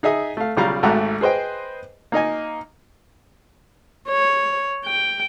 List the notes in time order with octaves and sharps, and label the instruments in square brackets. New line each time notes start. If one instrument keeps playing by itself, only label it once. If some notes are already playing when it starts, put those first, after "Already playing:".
[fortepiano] D#4 G#4 D#5 E5 D#6
A3 F5
B1 C#3 G3 F4 F5 A#5
G#1 G#2 A3 F#4 A#5
G#4 B4 C5 D#5 G5
A#3 D#4 D#5 G#5
[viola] C#5
G5